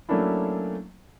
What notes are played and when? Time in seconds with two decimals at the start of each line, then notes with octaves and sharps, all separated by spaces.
0.09 F#3 A3 A#3 C#4 D4 E4